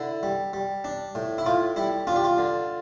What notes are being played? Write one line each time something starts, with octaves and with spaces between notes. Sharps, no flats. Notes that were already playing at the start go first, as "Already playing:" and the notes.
Already playing: D3 E4
G3
G3
D4
A2
E4
A2 F4
G3 E4
D4 F4
G4
F4
D3